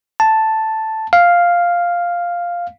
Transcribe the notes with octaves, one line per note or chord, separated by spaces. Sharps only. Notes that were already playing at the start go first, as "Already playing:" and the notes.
A5
F5